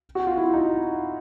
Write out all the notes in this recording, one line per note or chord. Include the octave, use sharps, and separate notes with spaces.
F#4
F4
E4
D#4